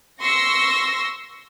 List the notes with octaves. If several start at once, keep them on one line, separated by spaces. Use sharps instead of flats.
C6 C#6 E6 A#6